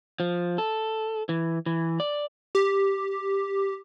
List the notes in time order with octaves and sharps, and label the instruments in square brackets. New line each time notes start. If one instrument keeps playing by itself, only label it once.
[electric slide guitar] F3
A4
E3
E3
D5
[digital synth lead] G4